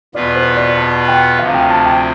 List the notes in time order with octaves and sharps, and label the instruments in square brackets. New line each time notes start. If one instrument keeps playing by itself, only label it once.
[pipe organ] E2 B2 B3 F4 B4 [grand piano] D5
[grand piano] C5
D5
A5
G5
[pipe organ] D2 C3 F3 [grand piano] F5
[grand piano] G5
A5
G5